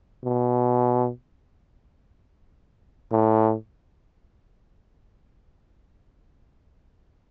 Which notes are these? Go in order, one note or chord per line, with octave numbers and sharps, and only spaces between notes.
B2
A2